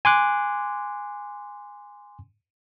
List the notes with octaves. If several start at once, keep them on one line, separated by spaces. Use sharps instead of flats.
G#5 C6 D6 F#6